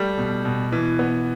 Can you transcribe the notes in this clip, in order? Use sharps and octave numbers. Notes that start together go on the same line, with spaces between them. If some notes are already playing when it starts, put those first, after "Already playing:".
Already playing: G3 A3
B2
B2
B2 E3
B3